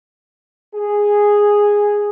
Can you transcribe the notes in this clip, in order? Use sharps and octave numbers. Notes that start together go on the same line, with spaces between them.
G#4